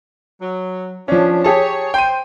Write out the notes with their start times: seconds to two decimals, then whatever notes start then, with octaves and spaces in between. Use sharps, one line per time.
0.41 F#3
1.08 F3 C#4 D4 C#5
1.44 G4 G#4 C#5 A5
1.94 C5 G5 D#7